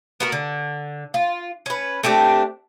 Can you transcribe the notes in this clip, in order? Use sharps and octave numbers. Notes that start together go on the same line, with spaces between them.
B3 F#4 A#4
D3
F4
C#4 B4
A3 C4 D4 G4